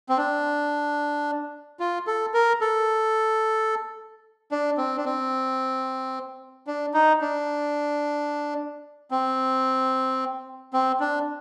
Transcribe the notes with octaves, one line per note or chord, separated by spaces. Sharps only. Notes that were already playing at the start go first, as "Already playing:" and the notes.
C4
D4
F4
A4
A#4
A4
D4
C4
D4
C4
D4
D#4
D4
C4
C4
D4